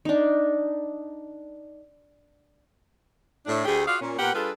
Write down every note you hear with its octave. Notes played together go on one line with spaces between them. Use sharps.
D4 D#4
A2 D4
D2 A3 G4 G#4
F4 F#4 G#4 D5 F5
A#2 C#4
A#2 B3 G4 A#4 F#5
G3 D4 F4 G#4 A4 B4